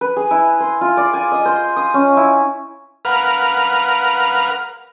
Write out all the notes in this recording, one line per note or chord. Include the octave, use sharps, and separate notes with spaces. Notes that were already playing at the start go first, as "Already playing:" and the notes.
B4
G#4
E4
C5
F4
D5
G#5
D#5
C5
D#6
C#4
E4
A#4 B4 F5 F#5 F6